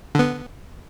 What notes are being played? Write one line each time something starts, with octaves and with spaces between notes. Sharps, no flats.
D3 B3